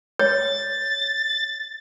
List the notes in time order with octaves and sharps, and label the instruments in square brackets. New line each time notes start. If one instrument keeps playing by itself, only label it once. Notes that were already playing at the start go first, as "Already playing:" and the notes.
[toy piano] C#5 [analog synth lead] A6